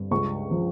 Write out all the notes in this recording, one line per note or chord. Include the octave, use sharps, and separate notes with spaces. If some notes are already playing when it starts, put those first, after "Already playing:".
Already playing: G2
C#2 C#6
F3